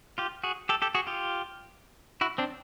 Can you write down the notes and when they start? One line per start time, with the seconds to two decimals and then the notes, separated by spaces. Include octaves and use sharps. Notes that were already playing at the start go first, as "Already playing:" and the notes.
0.18 F4 G4
0.44 F#4 G#4
0.69 G4 A4
0.82 G4 A4
0.95 F#4 G#4
1.07 F4 G4
2.21 E4 F#4
2.38 C4 D4